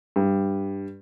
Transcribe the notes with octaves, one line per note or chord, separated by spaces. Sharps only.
G2